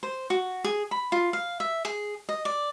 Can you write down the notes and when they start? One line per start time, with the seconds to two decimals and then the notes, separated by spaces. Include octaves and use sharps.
0.03 C5
0.30 F#4
0.64 G#4
0.91 B5
1.12 F4
1.33 F5
1.60 E5
1.85 G#4
2.29 D#5
2.45 D5